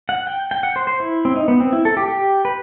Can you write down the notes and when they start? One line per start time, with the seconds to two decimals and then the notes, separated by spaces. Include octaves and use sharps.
0.09 F#5
0.27 G5
0.51 G5
0.63 F#5
0.76 C5
0.87 C5
1.00 E4
1.25 C4
1.36 D#4
1.48 B3
1.60 C4
1.72 E4
1.85 A4
1.97 G4
2.08 G4
2.45 B4